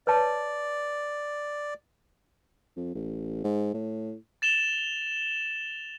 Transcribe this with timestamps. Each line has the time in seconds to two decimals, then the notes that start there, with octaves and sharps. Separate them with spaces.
0.07 B4 C#5 D5 A5
2.76 F2
2.95 A1
3.44 G#2
3.74 A2
4.42 A6 E7 F7 G7